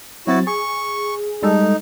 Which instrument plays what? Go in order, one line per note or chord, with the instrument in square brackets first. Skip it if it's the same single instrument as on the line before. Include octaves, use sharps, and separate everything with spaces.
[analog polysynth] F#3 C4 A6 [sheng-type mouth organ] E4 F#4
[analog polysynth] G#4 [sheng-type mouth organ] C#6
[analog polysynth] G3 G#3 A4 [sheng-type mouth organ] D#4